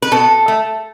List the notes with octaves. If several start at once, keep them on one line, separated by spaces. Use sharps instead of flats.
B4
B2 A4
A3